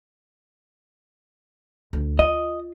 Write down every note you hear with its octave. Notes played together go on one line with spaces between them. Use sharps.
D2
F4 D#5